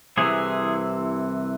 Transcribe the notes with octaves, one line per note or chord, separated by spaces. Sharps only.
C2 C3 E3 G#4